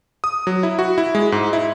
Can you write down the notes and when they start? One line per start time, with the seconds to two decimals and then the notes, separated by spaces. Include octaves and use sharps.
0.24 D#6
0.47 F#3
0.63 E4
0.79 F#4
0.98 E4
1.15 G#3
1.32 G#2
1.53 E4